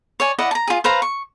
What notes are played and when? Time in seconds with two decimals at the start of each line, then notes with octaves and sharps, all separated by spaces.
0.20 C#5 D5 G#5
0.39 E4 D5 D#5 F#5
0.51 A5 A#5
0.68 F4 G#4
0.84 B4 C5 F5 A#5
1.02 C#6